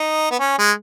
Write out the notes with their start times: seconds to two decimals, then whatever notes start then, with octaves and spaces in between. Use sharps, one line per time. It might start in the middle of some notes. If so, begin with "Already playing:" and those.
Already playing: D#4
0.31 B3
0.40 C#4
0.58 G#3